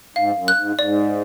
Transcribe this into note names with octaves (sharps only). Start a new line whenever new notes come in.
G#2 F5
F#2
F#6
G#2
G#2 D5